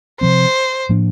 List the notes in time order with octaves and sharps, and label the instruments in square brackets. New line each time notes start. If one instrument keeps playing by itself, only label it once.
[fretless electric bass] C3 F3 C4 [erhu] C5
[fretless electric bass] A2 F3 A#3 D4